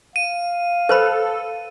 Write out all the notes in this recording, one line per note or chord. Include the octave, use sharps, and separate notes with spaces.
F5 D#7
A4 B4 C5 B5